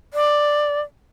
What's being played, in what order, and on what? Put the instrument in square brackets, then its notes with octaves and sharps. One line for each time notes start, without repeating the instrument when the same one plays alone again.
[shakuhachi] D5